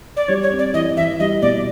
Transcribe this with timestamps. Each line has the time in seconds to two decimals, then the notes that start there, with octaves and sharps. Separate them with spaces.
0.17 D5
0.28 G3 C#5
0.43 C#5
0.51 C4
0.59 D5
0.73 E3 D#5
0.97 E3 E5
1.20 G3 D#5
1.42 B2 D5